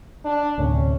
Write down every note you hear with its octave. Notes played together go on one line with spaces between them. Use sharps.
D4
D2 A2 C3 C#4